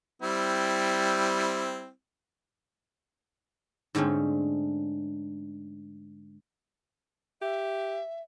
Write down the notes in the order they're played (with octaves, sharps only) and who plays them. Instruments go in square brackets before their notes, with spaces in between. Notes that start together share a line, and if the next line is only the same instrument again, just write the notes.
[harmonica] G3 C4 E4
[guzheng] G#2 D3 A3 C4 C#4
[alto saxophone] G4 [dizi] E5